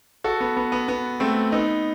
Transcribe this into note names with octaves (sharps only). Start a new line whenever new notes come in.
F#4 A4
B3
B3
B3
B3
A3 C4
B3 D#4